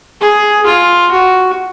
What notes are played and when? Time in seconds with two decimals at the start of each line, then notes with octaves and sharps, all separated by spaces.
0.22 G#4
0.66 F4
1.12 F#4